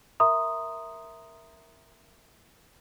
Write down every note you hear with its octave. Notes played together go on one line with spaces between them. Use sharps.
A#4 E5 A#5 C6 D#6